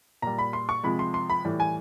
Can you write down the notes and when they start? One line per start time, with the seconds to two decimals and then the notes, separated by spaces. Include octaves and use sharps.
0.22 A#2 G3 A#5
0.38 B5
0.53 C6
0.69 C#6
0.84 C3 F3 G#3 B5
0.99 C6
1.14 C6
1.30 B5
1.45 A2 E3 G3
1.60 G#5